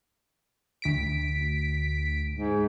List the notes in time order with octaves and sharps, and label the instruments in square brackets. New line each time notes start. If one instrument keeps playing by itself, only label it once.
[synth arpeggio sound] D2 B6 D7
[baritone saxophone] G#2